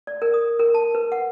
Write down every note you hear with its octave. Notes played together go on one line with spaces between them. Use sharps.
D5
A#4
D#6
A#4
A5
B4
F#5